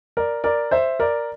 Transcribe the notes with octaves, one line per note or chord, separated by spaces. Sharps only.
A#4 D5
A#4 D5
C5 E5
A#4 D5